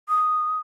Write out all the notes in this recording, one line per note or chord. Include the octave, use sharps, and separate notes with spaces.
D#6